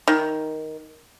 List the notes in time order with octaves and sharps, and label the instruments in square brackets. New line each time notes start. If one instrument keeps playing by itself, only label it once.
[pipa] D#3